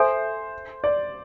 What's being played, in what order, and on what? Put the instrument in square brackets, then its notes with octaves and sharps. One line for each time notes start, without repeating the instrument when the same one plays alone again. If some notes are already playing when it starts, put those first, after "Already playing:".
Already playing: [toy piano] A4 E5 G#5 [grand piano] C5
[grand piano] D5